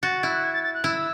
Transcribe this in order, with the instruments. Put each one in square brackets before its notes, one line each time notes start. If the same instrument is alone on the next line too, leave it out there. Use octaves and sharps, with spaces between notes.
[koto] F#4 [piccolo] A6
[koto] E4 [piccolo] E6
[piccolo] F#6
G#6
A6
A6
F#6
[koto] E4 [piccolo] E6